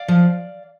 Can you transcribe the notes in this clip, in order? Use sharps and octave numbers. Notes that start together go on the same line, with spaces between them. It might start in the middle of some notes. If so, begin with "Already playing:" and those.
Already playing: D5 F5
F3